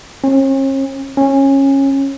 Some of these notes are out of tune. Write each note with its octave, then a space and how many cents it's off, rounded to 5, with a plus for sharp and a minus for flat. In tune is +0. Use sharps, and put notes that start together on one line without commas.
C#4 -45
C#4 -20